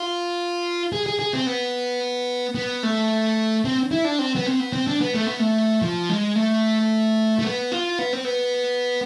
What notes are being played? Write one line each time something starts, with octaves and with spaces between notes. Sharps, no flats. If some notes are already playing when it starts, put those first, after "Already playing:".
Already playing: F4
G#4
G#4
G#4
C4
B3
B3
A3
C4
E4
D4
C4
B3
C4
B3
C4
D4
B3
A3
B3
A3
F3
G#3
A3
A3
B3
F4
B3
C4
B3